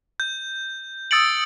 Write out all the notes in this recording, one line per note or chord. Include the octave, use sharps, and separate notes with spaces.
G6
D#6 E6 A6 C#7 D7 F#7